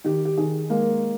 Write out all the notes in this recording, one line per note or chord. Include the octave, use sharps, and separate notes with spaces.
D#3 G4
G4
D#3 G#4
G#3 A#3 A#4